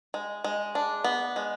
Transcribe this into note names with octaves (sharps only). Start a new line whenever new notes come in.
G#3
G#3
D4
B3
G#3